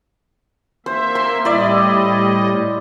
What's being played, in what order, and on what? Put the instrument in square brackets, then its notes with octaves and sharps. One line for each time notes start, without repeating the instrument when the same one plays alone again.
[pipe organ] A#3 E5 [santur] C5
[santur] C6
[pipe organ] A2 G3 D#5 [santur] E4 D5